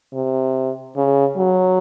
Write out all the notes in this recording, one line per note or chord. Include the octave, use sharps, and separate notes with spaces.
C3
C#3
F#3